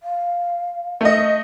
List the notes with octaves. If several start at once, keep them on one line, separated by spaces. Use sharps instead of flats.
F5
A3 D#5